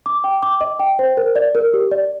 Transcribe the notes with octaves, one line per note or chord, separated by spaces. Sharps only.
D6
G5
D6
D#5
G5
C5
A#4
D5
A#4
G4
D5